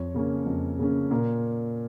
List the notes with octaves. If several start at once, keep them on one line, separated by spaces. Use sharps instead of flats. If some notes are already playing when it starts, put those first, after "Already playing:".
Already playing: F2 C#5
C#3 A#3 C#4
F2
C#3 A#3 C#4
A#2 A#4